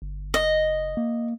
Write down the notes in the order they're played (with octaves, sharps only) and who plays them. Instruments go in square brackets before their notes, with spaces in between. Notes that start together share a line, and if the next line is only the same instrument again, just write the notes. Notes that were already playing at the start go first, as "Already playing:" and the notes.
[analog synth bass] G1
[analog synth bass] F#1 [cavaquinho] D#5
[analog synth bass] A#3